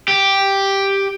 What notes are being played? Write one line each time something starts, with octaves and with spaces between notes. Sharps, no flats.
G4